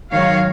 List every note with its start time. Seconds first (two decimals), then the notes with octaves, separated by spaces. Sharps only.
0.12 G#2 D#3 F#3 C#5 F5